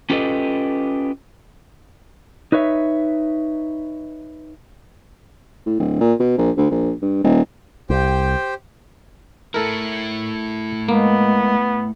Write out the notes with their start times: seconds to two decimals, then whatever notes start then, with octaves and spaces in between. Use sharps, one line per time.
0.10 C#4 F4 G4 A4 B4 D#5
2.52 D#4 B4 C#5 E5
5.66 A2
5.79 D1
6.00 A#2
6.20 B2
6.38 A#1
6.57 D2
6.71 A#1
7.02 G2
7.24 D#1
7.90 C2 G4 C5 G5
9.54 A3 E4 A4 A#4
10.89 G#3 A#3 B3